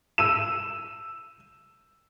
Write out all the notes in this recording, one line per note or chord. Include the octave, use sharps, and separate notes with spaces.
E6 D#7 E7